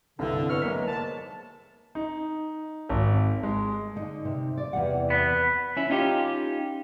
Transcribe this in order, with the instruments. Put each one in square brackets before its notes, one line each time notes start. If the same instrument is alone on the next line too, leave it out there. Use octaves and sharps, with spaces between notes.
[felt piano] C2 G2 E3 [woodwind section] D3
[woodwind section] A2 C#6 F6 [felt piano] B3
[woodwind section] E3 F#3 G#3 [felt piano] A#3 B6
[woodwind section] G#2 A5
[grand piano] D#4
G#1
G#3
[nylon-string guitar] D3 D#4
C3
D5
E2 C3 F#5
[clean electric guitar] B3
C#4 E4
C#4 D#4 F4 G4